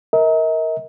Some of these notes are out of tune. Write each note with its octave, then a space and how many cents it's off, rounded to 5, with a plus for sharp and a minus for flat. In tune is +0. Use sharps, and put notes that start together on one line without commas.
A#4 +0 D#5 +45